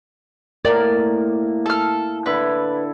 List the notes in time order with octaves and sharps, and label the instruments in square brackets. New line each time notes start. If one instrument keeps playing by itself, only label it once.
[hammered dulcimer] A2 A#3 [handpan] A#4 [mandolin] D5
[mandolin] A4 F6
[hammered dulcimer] D3 E4 [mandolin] B4